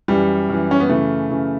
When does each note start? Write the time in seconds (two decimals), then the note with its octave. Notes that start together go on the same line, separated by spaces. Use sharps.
0.08 F#2 E3 G3
0.49 F#2 E3
0.71 C#4
0.80 B3
0.89 F#2 C#3 E3 A3
1.30 F#2 C#3 E3